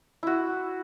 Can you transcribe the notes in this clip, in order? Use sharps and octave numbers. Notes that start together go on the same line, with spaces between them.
E4 F#4